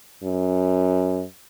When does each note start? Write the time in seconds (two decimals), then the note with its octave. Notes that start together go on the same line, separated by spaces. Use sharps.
0.24 F#2